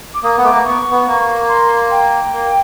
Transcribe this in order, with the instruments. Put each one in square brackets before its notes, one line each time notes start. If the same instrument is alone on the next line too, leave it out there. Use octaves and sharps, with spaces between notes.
[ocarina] D6
[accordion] A#3 [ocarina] D#6
[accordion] B3
[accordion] A3 [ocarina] D6
[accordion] A#3
[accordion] B3 [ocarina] C#6
[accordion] B3
A#3
[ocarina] C6
G5
[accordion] A#3